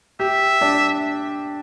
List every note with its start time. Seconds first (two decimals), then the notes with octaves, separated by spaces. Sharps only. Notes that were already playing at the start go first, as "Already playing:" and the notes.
0.20 G4 E5
0.61 D4